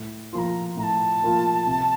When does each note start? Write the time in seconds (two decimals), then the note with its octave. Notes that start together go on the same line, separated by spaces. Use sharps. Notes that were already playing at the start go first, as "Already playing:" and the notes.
Already playing: A2
0.33 F3 A#3 F4 A#5 C6
0.77 A2 A#5
0.83 A5
1.23 F3 A#3 F4
1.67 C3